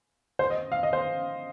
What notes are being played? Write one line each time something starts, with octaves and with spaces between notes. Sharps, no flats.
C5
D#5
F5
D#5
C5